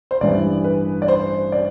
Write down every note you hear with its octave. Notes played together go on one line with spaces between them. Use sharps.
C5
A1 G2 E3 D5
B4
D5
C5
D5